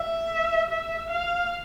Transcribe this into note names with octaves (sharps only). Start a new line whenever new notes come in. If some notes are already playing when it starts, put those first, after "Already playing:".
Already playing: E5
E5
F5